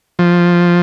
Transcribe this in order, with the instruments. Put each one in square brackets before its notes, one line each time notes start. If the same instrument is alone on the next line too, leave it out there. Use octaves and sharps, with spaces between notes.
[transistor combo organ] F3